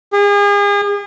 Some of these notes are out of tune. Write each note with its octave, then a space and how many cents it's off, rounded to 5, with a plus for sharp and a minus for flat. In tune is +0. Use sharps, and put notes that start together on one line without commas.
G#4 -40